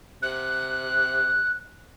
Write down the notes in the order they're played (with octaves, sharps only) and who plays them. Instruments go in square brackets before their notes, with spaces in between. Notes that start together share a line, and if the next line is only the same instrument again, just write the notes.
[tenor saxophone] C3 [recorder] F#6